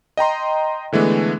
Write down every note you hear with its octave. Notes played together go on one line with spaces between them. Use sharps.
D#5 G5 A#5 C6
D3 E3 G#3 A3 B3